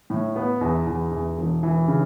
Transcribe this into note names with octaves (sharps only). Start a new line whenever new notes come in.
A2
B3
E2
E2
E2
E1
E3
C#3